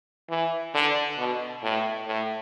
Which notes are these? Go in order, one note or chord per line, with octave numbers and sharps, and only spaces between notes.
E3
D3
B2
A2
A2